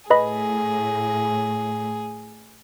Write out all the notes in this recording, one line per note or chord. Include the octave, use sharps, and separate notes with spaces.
A2 G#4 B4 D#5 B5